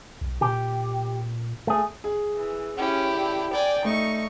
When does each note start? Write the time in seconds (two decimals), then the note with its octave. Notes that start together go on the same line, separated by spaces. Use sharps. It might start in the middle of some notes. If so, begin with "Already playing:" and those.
0.21 B1
0.41 A#2 G4
1.67 A3 G#4
2.04 G#4
2.36 E3
2.77 C#4 E4 G4
3.15 D3
3.53 D5 G5 G#5
3.85 A3 D#4 C#6